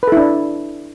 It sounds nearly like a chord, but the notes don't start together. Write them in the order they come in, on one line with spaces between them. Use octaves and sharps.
B4 A4 E4 D4